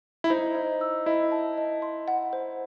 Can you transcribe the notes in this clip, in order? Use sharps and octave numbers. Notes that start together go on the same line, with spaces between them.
E4
D#4 C5
D#5
E6
E4 D#5
A5
D#5
C6
F#5
C5